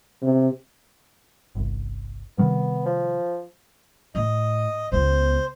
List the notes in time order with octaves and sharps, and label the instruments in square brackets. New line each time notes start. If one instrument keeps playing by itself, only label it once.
[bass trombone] C3
[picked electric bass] G1 C2
[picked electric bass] C3 D#3 G3 [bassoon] B3
[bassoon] F3
[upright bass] A2 [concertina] D#5
[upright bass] C#2 B3 [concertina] C5